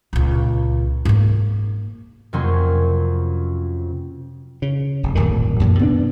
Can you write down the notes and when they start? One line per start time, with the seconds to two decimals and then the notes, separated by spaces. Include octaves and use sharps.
0.13 C#2 A#2
1.05 G#2 A#3
2.33 F2 C3 F#3 A#3 C#4 C6
4.62 C#3
5.03 F1
5.15 D1 G1 A#2 D#3
5.60 F#2 A#2 E3
5.79 C3 B3 C4 D4